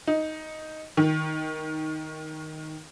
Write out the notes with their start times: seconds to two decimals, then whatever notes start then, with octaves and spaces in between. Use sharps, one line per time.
0.08 D#4
0.97 D#3